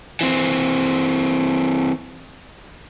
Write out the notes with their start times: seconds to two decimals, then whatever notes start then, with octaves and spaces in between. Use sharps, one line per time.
0.21 E3 C4